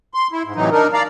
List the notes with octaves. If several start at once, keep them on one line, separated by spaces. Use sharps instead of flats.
C6
E4
G#2
A2 C3 E3 F#3 D#4
D4 D#4 A#4
D5 F5 A#5